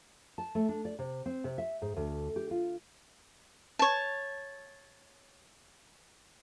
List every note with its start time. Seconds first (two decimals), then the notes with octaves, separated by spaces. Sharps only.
0.38 A5
0.55 A3
0.69 D4
0.85 D5
0.99 C3
1.26 C4
1.44 C3
1.58 E5
1.82 G#2
1.96 D2
2.36 G4
2.51 F4
3.79 C#5 A5